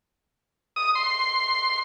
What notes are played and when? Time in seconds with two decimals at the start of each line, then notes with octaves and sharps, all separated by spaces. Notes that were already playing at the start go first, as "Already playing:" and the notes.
0.76 D#6
0.95 C6